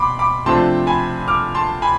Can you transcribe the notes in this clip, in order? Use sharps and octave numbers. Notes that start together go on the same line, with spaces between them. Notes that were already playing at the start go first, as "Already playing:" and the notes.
Already playing: B2 B5 C6 D6
B5 D6
C3 F3 A3 D4 A5 C6
G#5 B5
D6 F6
A5 C6
G#5 B5